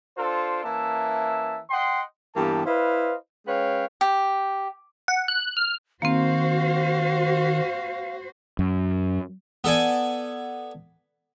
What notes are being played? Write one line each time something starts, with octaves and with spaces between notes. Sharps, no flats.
D4 F4 A4 C5
E3 A#3 C#4 E5 A5
D#5 F#5 G5 C6
G2 E3 A#3 B3 G4 A5
E4 B4 C5 D#5 F5
G#3 C#4 B4 C#5 F5 G5
G4
F#5
F#6
F6
D#3 A#3 C4 F#4 C5 F5
F#2
B3 A4 D5 G#5